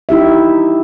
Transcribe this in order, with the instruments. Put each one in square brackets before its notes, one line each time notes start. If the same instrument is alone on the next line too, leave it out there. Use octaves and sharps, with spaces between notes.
[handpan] D#4 E4 G4 E5